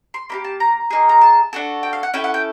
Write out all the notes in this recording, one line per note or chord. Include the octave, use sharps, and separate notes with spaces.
C6
A#3 D4 G4 B5
A5
A#5
A#3 D#4 G#4
A#5
A5
D4 F#4 A4
G5
F5
F#5
C#4 E4 A4 G5
F#5
G5